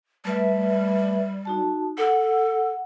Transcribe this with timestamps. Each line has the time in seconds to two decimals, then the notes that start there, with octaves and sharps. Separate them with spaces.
0.25 G3 A3 B4 E5
1.45 D#4 F#4 A5
1.98 A4 F#5